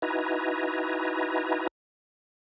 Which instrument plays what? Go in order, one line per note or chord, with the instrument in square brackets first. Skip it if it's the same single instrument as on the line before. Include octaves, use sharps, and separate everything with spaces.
[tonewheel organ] D#4 E4 F#4 B4 G#5 A#5